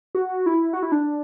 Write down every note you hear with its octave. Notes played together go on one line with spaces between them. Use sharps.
F#4
E4
F#4
E4
D4